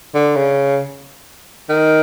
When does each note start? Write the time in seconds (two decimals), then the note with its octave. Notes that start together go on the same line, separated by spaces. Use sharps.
0.14 D3
0.36 C#3
1.69 D#3